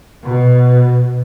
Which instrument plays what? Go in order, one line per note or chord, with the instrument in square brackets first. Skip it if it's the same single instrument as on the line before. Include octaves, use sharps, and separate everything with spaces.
[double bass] B2